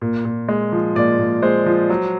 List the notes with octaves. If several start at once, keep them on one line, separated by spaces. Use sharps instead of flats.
A#2
A#2
G#3
F3
A#2 D5
A#2
G#3 C5
F3
F#3